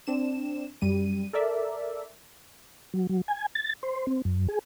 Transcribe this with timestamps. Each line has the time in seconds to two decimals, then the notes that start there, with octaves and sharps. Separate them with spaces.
0.07 C4 D4 E7
0.81 F#2 G3 D#7
1.33 A4 A#4 D5 E5
2.94 F#3
3.09 F#3
3.28 G#5
3.55 A6
3.83 C5
4.07 C4
4.25 F#2
4.48 G#4